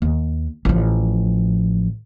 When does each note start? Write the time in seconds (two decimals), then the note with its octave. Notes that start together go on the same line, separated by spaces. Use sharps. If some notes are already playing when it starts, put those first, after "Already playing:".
0.02 D#2
0.65 A1 F3